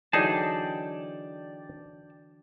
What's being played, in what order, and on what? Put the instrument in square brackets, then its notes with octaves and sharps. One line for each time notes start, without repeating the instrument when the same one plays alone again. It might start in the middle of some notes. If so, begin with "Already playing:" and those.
[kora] D3 E3 F#3 [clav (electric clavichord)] D#4 G#4 [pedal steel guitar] D5 G5 A5